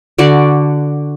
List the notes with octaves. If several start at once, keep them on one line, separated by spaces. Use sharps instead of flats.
D3 F#4 D5 A5